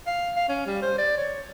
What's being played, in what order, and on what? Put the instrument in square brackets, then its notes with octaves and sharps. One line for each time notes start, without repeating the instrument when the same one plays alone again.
[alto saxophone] F5
F5
C#4
G3
C5
D5
C#5